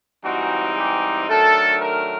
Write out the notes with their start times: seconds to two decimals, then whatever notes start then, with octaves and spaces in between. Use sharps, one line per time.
0.24 G#2 E3 G3 C4 D#4 F#4
0.77 G4
1.29 D#3 F#3 A3 D4 A4
1.81 A#4